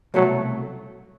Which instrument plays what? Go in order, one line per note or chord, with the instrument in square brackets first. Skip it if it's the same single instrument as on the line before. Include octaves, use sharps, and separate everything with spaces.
[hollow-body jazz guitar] C2 B2 A3 [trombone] F#3